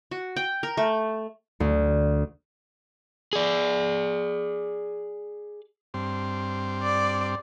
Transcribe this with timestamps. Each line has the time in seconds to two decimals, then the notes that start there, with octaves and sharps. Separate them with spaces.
0.11 F#4
0.36 G5
0.63 A#4
0.77 A3
1.60 D2
3.33 G#4 D5
5.94 G2 C4
6.82 D5